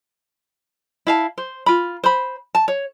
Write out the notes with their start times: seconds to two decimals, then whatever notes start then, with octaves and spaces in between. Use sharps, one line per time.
1.07 E4 F5 A5
1.38 C5
1.66 F4 B5
2.04 C5 B5
2.55 A5
2.68 C#5